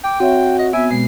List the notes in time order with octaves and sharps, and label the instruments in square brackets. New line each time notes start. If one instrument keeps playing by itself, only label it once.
[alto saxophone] G5 [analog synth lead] D6
[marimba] C4 C#5 E5 [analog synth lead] F#4
[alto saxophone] D#5
[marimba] B3 F#4 [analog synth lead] E5 [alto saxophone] G#5
[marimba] B2 G#3 [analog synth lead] C7